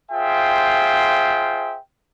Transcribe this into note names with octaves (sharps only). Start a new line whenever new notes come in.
F4 G#4 C5 E5 G5